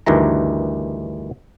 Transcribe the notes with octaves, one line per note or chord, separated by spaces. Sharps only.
D2 G2 D#3 E3 A#5